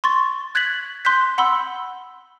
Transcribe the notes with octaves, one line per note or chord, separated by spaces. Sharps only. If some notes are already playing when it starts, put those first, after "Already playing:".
C6 C#6 A6
F#6 G#6 A6 B6 F#7
C6 F#6 G6 B6
F#5 B5 C6 E6